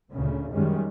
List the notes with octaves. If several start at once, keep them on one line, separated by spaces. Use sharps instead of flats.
D2 A#2 C#3
F#2 D#3 G3 G#3 C#4